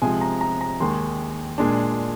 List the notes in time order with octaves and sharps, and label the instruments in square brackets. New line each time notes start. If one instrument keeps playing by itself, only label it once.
[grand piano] C3 F3 G#3 G#5
A#5
A#5
A#5
D#2 D#3 G#3 C6
A#2 G#3 D4